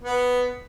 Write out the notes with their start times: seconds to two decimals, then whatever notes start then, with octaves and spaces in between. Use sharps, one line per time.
0.02 B3